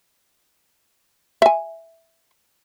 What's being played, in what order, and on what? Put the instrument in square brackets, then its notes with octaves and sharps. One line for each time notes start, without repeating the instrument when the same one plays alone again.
[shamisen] E5 G#5